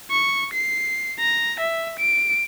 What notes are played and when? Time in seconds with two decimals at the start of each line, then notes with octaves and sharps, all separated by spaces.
0.11 C#6
0.53 C7
1.20 A#5
1.59 E5
1.99 D7